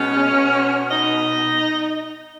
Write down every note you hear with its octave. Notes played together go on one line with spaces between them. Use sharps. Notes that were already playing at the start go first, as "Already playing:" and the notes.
Already playing: B2 G#3 B3 C#4 C#5
B2 B3
D#4 D#5